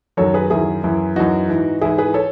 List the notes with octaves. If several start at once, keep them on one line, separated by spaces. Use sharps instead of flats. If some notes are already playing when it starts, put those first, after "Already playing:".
F#2 D#3 F#3 A4 C#5
G#4 B4
F#2 D#3 F#3 E4 G#4
F#2 E3
F#2 E3 D#4 F#4
G#2 E3
G#2 E3 E4 G#4
G#4 B4
A4 C#5